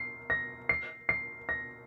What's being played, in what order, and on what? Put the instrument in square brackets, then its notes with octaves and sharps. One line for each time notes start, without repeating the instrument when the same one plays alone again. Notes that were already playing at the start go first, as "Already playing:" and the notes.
Already playing: [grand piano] C7
A#6
C7
C7
A#6